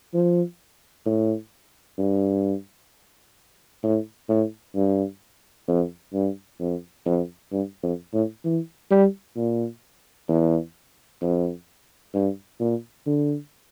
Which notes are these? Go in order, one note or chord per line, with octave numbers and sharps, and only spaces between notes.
F3
A2
G2
A2
A2
G2
F2
G2
F2
F2
G2
F2
A2
E3
G3
A#2
E2
F2
G2
A#2
D3